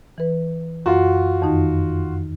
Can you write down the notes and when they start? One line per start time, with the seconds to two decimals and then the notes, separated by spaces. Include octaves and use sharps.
0.18 E3 B4
0.86 F#2 F4 F#4
1.42 F2 D#3 D#4